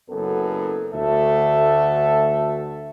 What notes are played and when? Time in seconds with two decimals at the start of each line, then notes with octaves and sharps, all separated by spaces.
0.10 F#1 F#2 B3 A4
0.93 D2 A3 F#4 A4 E5